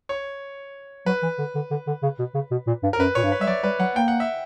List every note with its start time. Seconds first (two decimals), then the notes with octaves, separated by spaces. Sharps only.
0.09 C#5
1.06 F#3 B4
1.22 E3
1.38 D3
1.55 D3
1.71 D3
1.87 D3
2.03 C#3
2.19 B2
2.35 C#3
2.51 B2
2.67 A#2
2.83 G2
2.93 A#4
3.00 F#2 B4
3.15 A#2 C#5
3.24 G2
3.32 B4
3.41 G3 E5
3.47 F#3 D5
3.63 G3 B4
3.80 F#3 F#5
3.96 A#3 G5
4.08 F#5
4.20 E5